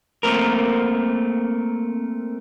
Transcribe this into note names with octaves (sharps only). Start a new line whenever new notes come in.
A3 A#3 C4 A#4